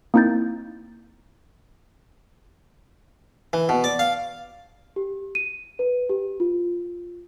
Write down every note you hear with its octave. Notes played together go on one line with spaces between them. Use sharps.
A#3 C4 D#4 E4 G6 A6
E3
B2
D5
F5
G4
D#7
B4
G4
F4